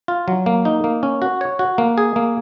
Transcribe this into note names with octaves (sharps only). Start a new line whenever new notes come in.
F4
F#3
A#3
D#4
A#3
C#4
F#4
C#5
F#4
A#3
G#4
A#3